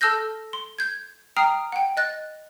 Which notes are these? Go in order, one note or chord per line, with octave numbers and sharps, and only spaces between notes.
A4 A5 E6 F6 G6 A#6
C6
G6 G#6
G5 A#5 D#6 F6 C7
F#5 G5
D#5 F#6 A6